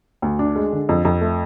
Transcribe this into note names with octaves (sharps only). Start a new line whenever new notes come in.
D2
D4
G#3
D3
F2
F2
A3